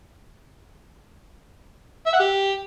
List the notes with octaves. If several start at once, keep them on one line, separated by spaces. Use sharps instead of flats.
E5
F#5
G4